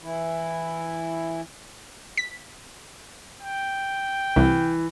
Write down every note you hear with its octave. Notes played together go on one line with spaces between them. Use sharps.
E3 E4
B6
G5
C2 E3